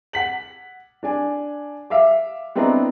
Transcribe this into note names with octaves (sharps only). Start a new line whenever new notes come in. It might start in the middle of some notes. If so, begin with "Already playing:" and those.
F#5 B6 F#7
D4 D5 G#5
E5 F5 D6
B3 C4 D4 E4 D#5 A#5